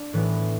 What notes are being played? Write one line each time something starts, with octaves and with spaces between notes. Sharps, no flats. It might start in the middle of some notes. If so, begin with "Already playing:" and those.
Already playing: D4
A2 E3 B3